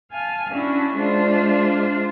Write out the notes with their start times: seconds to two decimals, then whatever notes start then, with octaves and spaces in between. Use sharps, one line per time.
0.12 F5 G#5 A5
0.51 C#4 D4 E4 F#4
0.96 G#3 D4 F4 C5 D5 E5